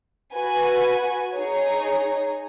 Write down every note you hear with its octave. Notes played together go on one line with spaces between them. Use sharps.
F#4 B4 G#5
D#4 G#4 C#5